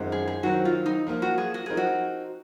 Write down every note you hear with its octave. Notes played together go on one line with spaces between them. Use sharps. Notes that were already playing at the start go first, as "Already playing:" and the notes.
Already playing: F#2 D#3 G#3 C4 F4
G#4
G#4
D#3 F#3 C4 F#4
F4
D#4
F3 A#3 F4
F#4
G#4
F#4
F3 C4 D#4 G#4 A#4
F#4